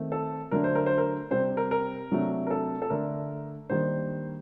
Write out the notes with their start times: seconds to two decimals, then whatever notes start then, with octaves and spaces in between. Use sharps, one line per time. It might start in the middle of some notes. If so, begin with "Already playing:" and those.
Already playing: D#3 A3 C4
0.12 A4
0.51 D3 F#3 A3 D4 A#4
0.64 C5
0.75 A#4
0.86 C5
0.98 A#4
1.31 C3 G3 C4 C5
1.57 A#4
1.71 A#4
2.11 C3 F#3 A3 D4
2.47 A#4
2.50 A4
2.82 A4
2.90 D3 A3 D4 A#4
3.69 D#3 G3 A#3 D4 C5